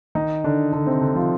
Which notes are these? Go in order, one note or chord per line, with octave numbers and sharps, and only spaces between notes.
D#3 D#4
D3 D4
D3 D4
C3 C4
D3 D4
F3 F4